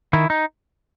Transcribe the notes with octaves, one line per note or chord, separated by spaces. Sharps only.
D#3 E4
D#4